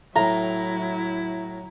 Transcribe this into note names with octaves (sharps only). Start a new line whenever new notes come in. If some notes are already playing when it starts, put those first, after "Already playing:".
A2 F#3 E4 A#5